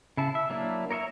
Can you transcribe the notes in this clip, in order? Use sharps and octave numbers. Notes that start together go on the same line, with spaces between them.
C#3 E4 A5
E5
F#3 A#3 D4 E4
A#4 C#5 D#5 E5 A#5